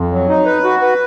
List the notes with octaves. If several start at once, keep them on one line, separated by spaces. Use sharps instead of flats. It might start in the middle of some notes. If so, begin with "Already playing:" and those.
Already playing: F2
F#3
D#4
B4
F#4
B4